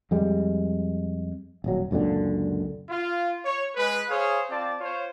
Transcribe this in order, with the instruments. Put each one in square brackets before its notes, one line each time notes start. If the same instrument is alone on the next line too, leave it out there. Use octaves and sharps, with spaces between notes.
[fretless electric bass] F2 G3 G#3
D#1 F#3
C#2 F#2 A#2 D3
[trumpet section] F4
C#5
G#3 B4
G#4 C5 C#5 F5
C4 F4 D5 A5
F4 C5 C#5